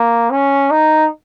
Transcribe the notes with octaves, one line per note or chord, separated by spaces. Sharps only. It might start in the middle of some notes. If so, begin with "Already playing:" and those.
Already playing: A#3
C#4
D#4